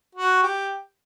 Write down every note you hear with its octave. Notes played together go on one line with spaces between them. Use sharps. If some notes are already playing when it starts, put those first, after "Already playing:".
F#4
G4